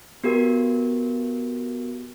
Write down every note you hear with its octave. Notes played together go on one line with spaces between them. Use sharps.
B3 F#4 G4 A#4